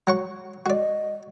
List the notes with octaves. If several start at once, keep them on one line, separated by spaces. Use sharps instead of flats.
F#3 F#5 C#6
F#4 D5 D#5